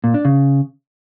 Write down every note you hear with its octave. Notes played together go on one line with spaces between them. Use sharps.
A#2
D4
C#3